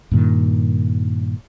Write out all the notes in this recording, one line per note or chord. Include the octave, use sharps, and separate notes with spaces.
G2 A#2 D#3